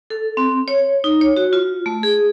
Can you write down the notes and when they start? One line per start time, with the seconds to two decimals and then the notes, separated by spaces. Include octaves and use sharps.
0.10 A4
0.37 C4
0.68 C#5
1.04 D#4
1.21 C#5
1.36 F#4
1.53 F4
1.86 A3
2.03 G#4